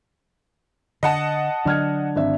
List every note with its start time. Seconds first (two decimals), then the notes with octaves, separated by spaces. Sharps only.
1.03 D3 D#5 F#5 A5
1.65 D3 F#3 D4 F6 G#6
2.16 G#1 D4 E5